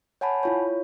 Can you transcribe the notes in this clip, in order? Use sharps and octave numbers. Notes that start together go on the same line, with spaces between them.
C#5 F#5 G#5 A5 B5
E4 F4 C#5